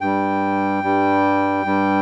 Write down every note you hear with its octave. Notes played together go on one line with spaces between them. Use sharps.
G2 G3 G5
G2 G3
G2 G3